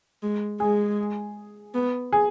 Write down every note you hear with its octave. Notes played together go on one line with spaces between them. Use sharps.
G#3
G#3 G#4
B3
G#4